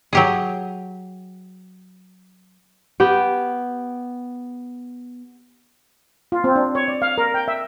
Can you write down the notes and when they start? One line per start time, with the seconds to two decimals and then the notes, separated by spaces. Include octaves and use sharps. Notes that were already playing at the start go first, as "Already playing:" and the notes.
0.13 F#3 G4 G#4
3.00 B3 G4 G5
6.32 F4
6.44 C4
6.55 D4
6.75 C#5
6.88 D5
7.02 F5
7.18 A#4
7.34 G5
7.48 E5